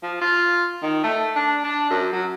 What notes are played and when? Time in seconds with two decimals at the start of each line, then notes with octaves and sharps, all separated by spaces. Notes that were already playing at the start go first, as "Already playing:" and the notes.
0.03 F3
0.21 F4
0.82 D#3
1.04 A3
1.36 D4
1.64 D4
1.90 F#2
2.13 F#3